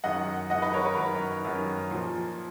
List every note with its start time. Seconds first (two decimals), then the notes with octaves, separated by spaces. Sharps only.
0.04 F#2 D#3 D#5 F#5
0.50 F#2 D#3 D#5 F#5
0.62 B4 D#5
0.74 A#4 C#5
0.85 B4
0.97 F#2 D#3 A#4
1.44 F#2 D#3
1.91 A#2 F3